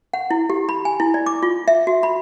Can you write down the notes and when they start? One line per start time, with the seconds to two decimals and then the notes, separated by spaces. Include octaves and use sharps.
0.13 F#5
0.30 E4
0.50 G4
0.69 B5
0.85 G#5
1.00 E4
1.14 D5
1.26 D6
1.43 F4
1.68 E5
1.87 F#4
2.03 B5